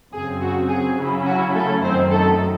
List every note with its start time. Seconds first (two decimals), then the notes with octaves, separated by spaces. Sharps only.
0.12 F#2 C#3 F#3 C4 G#4
0.41 F#4
0.69 G#4
0.97 C#3 F#3 C#4 E4 F#4
1.25 F#4
1.54 A3 A4
1.82 F#2 D#3 F#3 C4 C5
2.11 A3 A4